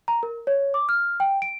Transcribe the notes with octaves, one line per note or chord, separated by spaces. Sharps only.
A#5
A#4
C#5
D6
F6
G5
D7